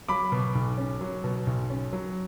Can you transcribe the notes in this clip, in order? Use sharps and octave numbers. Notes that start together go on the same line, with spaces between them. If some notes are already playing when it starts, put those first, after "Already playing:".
F#3 B5 D6
B2
B1
C#4
F#3
B2
B1
C#4
F#3